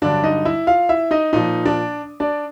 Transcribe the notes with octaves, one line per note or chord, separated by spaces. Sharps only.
G2 D3 F#3 D4 D5
D#4 D#5
E4 E5
F4 F5
E4 E5
D#4 D#5
A#2 F3 D#4 D#5
D4 D5
D4 D5